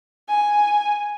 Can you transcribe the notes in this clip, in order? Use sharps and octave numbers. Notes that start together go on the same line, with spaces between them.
G#5